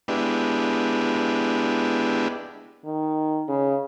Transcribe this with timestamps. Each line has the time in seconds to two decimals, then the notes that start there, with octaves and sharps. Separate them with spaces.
0.08 G#3 B3 D4 E4 G4
2.85 D#3
3.48 C#3